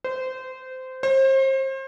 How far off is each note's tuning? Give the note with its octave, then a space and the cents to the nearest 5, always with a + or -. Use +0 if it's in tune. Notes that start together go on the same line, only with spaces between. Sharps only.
C5 -20
C5 +35